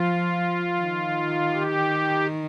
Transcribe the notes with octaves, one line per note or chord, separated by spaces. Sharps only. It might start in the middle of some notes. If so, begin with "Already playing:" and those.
Already playing: F3 F4
D#3
G4